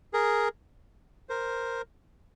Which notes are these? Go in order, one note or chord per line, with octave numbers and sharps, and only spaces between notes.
G#4 A#4
A#4 C5